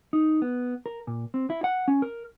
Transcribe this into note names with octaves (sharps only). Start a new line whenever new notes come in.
D#4
B3
A#4
A#2
C4
E4
F#5
C#4
A#4